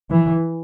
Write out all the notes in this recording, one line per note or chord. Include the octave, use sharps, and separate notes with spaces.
E3